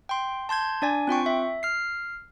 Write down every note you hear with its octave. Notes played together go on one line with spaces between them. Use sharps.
G5 C6
A5 C6 G6 G#6
D4 D5 G#5
C4 F4 G5 C#6
E5
F6 C7